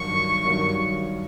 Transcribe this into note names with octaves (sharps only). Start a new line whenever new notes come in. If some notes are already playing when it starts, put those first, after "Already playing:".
Already playing: G2 D#3 F#3 C#6
G2 D#3 F#3